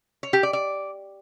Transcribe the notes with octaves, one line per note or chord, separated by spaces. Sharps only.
C#5
G4
D5
D5